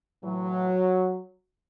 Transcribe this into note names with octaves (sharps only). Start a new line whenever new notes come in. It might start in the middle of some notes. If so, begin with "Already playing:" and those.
A2 E3 F#3